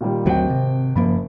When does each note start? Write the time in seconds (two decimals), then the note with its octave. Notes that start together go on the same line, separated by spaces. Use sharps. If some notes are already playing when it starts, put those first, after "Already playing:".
0.01 A#2 D#3 G3
0.26 G#1 D2 F#3 G5
0.50 C3
0.96 F#1 G2 F3 A#3 B5